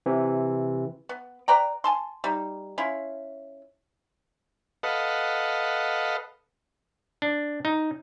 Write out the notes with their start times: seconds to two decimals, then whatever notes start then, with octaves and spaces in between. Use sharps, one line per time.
0.06 C3 E3
1.09 B3
1.48 B4 D5 G5 A#5
1.84 G#5 A5 C6
2.24 G3 D#4
2.78 C#4 E4 F4
4.83 A4 B4 D#5 F5 F#5
7.22 D4
7.65 D#4